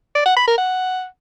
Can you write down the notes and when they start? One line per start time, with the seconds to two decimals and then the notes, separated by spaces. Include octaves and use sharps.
0.15 D5
0.26 F#5
0.37 B5
0.47 A#4
0.58 F#5